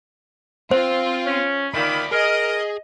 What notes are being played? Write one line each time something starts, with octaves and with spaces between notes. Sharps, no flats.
C4 F4 C5
C#4
A#2 D#3 D5 E5 B5
G#4 A#4 D#5